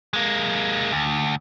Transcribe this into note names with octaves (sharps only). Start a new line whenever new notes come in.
G#3 A#3
D2